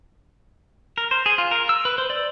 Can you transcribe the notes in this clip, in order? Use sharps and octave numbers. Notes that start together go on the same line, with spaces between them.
A#4
C5
G#4
F4
A#4
E6
B4
C5
D5